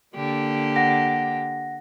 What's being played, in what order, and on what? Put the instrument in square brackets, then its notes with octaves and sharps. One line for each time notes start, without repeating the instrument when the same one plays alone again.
[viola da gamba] D3 A#3 G4
[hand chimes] F#5 A#6